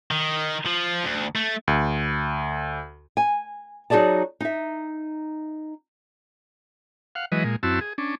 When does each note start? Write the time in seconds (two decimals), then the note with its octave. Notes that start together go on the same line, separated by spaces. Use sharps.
0.11 D#3
0.66 F3
1.04 D2
1.35 A3
1.68 D2
3.17 G#5
3.90 F#3 D#4 F#4 G#4 D5 A5
4.41 D#4 E5
7.15 F5 F#5
7.32 E3 F#3 G#3 B4 D#5
7.44 A#2 G#3
7.63 F#2 C4 E4 F#4 A5 E6
7.81 G#4
7.98 C#4 D4